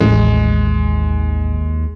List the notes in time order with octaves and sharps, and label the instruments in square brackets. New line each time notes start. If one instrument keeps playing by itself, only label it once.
[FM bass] A1 [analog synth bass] D#2 [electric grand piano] G#3